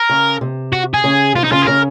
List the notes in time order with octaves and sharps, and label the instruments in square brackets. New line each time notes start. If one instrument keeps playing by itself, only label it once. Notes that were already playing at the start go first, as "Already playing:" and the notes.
Already playing: [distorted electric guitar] A#4
[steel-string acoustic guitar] C#3
C3
[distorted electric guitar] F#4
G#4
[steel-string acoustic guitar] C#3
[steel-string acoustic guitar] C3 [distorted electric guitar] F4
[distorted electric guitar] D#4
[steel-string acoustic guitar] C#3 [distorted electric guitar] F4
[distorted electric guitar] G#4
[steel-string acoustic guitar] C#3 [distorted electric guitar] A#4